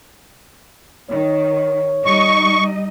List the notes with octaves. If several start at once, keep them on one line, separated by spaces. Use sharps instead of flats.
D#3 C#5
G3 D#4 D#5 C#6